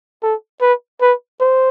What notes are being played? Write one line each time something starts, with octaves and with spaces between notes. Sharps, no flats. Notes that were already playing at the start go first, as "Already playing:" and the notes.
A4
B4
B4
C5